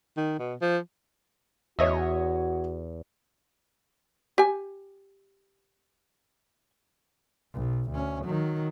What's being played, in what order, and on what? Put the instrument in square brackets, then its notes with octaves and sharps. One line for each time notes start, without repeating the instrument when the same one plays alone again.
[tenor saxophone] D#3
B2
F3
[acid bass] E2 [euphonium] F#4 [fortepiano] C#5 D#5 E5
[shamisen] G4 G#5
[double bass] B1
D2 C#4
D#3 F#3